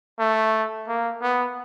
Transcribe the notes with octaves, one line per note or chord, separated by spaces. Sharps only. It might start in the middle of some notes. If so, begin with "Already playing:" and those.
A3
A#3
B3